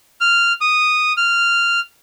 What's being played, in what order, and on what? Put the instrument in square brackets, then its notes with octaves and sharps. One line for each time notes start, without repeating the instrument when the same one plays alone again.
[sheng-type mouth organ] F6
D#6
F6